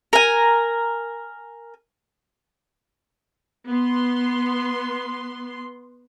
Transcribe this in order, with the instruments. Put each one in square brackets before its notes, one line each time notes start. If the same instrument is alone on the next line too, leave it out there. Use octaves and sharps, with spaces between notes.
[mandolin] A#4 G#5
[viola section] B3 C6